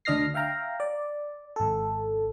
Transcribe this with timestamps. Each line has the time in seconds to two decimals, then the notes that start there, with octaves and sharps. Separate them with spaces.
0.05 D2 D4 D#5 F6 A#6 C7
0.34 E5 F5 G5 A#5
0.80 D5
1.56 G#1 A4